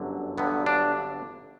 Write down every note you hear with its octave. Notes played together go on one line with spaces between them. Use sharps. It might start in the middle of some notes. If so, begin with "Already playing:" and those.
Already playing: G1 F#2 D3 F#3
G1 G2 D3 F#3 B3
D4